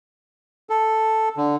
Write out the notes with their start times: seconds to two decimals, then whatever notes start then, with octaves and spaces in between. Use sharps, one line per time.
0.70 A4
1.37 D3